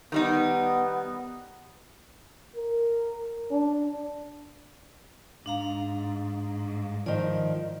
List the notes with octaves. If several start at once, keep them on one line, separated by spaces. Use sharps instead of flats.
D#3 G3 B3 D#4
A#4
D4
G#2 D4 F5 A#5
D#3 F3 D5